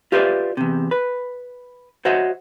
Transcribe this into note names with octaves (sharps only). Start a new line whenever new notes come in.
F4 G4 B4 C5 D5 E5
E2 C3
B4
F#4 C5 C#5 D#5 E5 F#5